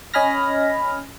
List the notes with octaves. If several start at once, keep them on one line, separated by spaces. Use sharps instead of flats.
C#4 D#5 G#5 B5 F6 A#6